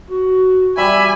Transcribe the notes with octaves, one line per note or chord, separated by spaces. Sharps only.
F#4
G3 E5 G#5 B5